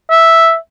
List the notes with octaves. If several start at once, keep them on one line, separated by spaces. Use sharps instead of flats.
E5